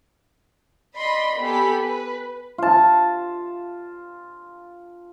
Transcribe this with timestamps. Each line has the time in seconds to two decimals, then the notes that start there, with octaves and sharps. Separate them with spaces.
0.98 D5 D#5 B5 C6
1.40 B3 G4 A4 G#5 B5
1.81 B4
2.58 F4 A5